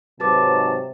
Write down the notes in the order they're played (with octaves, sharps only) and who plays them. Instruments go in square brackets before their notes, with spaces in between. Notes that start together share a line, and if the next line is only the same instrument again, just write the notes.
[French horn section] G#2 F#3 [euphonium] C3 [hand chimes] F#4 B4 D6 [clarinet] A5